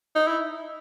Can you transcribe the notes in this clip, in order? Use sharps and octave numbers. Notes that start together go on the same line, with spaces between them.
D#4
E4